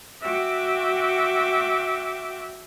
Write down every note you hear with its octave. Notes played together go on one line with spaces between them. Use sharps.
F#4 E5 G5 D6